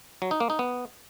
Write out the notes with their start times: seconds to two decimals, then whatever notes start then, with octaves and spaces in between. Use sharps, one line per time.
0.22 F#3
0.31 D#4
0.40 A#3
0.50 D#4
0.59 B3